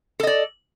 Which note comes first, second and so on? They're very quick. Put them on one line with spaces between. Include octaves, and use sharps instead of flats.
A4 D#5 D5